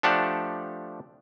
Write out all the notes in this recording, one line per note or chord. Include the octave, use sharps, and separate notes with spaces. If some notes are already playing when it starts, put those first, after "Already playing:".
F3 A3 D4 G4 F#5 A5